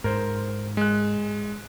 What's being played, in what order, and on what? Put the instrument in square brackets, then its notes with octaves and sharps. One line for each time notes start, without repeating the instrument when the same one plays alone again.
[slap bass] G#2 [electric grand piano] A#4 C5
[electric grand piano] G#3 F#6